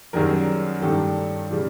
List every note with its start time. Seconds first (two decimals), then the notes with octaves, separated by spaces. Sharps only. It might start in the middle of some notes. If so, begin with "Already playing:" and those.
0.13 F#2 D#3 G3 G#4 A#4
0.81 G2 D#3 G3 G4 A4
1.50 C#3 E3 G3